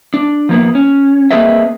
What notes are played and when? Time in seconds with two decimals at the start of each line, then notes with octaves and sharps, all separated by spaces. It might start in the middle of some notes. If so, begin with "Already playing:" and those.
0.14 D4
0.49 F3 A#3 B3
0.75 C#4
1.31 A#3 C4 G#4 B4 D#5 E5